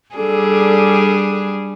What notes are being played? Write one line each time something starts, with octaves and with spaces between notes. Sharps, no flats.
G3 D4 G#4 A4